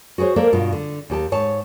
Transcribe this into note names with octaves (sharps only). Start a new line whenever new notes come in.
F#4 G#4 A#4 C5 C#5
A#3 A4 A#4 C5 D5
G2 B2 F4
D3
D#2 G4 A5
G#2 C#5 A5